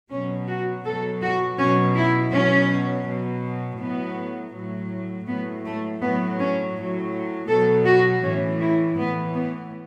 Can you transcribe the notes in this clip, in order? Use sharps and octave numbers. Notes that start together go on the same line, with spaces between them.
B2 F#3 C#4
F#4
B2 F#3 A4
F#4
B2 F#3 C#4
E4
B2 F#3 C#4
B2 F#3
A2 F#3 B3
A2 F#3
A2 F#3 B3
A3
A2 F#3 B3
C#4
A2 F#3
B2 F#3 A4
F#4
A2 E3 C#4
E4
A2 E3 B3
B3